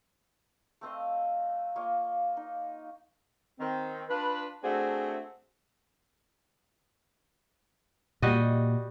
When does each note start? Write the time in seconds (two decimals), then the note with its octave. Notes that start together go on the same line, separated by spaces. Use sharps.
0.81 A3 C4 D#5 F5
1.76 A#3 F4 C#5 D#5
2.37 D#4
3.60 D#3 C4
4.09 D4 F4 B4
4.64 A3 C4 D4 F#4 G#4
8.22 A#2 G3 A#3 F#4 D#5